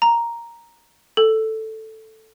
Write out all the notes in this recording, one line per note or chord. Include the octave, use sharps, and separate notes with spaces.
A#5
A4